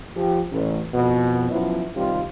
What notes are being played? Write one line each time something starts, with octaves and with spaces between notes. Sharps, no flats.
F3 G4
A1
F2 B2
F3 F#3 B3 C#4 E4
C3 D#3 G3 C4 F4